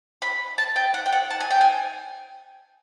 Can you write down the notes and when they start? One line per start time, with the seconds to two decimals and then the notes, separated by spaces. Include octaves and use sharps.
0.22 B5
0.58 A5
0.76 G5
0.94 F#5
1.06 G5
1.12 F#5
1.31 A5
1.40 G#5
1.51 G5
1.61 G#5